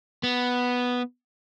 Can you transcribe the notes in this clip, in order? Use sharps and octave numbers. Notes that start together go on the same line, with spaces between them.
B3